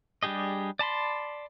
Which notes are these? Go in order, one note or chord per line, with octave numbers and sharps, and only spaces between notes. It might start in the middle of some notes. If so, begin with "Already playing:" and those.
G3 D4 G4 G#4 D#5
D5 A5 B5 C6